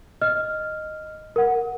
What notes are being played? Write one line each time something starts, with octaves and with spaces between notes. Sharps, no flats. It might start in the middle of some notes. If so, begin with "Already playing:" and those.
D#5 F6
A#4 F#5